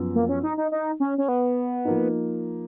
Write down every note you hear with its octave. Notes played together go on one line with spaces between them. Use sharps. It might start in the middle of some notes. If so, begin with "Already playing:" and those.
Already playing: F#2 F3 B3 F#4
A#3
C#4
D#4
D#4
D#4
C#4
C#4
B3
F3 A#3 D#4